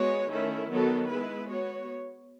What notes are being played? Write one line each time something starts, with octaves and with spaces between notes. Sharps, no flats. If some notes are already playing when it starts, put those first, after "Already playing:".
Already playing: G#3 B3 F#4 C#5
D#3 A3 C#4 E4
D#3 F#3 B3 F#4 A4
G#3 B3 E4 B4
B3 F#4 C#5